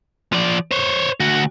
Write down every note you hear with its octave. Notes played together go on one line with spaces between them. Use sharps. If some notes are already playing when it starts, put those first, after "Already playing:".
F3 D5
C5 C#5
D2 F#4